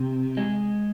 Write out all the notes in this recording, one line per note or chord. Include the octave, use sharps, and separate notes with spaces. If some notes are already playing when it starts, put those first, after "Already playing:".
Already playing: C3
G#3